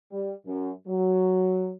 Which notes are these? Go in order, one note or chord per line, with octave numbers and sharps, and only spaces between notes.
G3
F#2
F#3